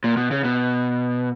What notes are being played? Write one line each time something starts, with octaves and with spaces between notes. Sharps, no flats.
A#2
B2
C#3
B2